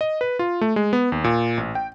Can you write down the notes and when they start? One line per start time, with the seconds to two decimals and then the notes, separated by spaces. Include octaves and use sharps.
0.01 D#5
0.21 B4
0.39 F4
0.61 A3
0.76 G#3
0.93 B3
1.12 D#2
1.24 A#2
1.57 A1
1.75 G5